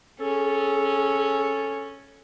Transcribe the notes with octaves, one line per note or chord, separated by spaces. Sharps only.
C#4 G#4 A4